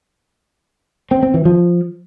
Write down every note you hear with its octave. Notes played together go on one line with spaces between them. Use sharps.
C4
C4
E3
F3